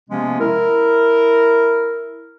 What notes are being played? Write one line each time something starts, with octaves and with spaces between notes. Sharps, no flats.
C3 F3 G#3 A#3 B3 C#4
E4 A#4